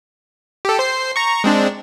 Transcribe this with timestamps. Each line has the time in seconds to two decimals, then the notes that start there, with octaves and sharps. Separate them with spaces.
0.65 G4 A4
0.79 C5 C7
1.16 A#5 C#6
1.44 G#3 C4 D4